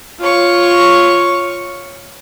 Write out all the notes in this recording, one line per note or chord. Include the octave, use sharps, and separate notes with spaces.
F4 C#5 C#6